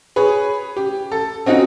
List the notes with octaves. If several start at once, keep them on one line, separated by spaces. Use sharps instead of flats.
G#4 B4 C#5
G4
A4
C4 C#4 D#4 F4 F#4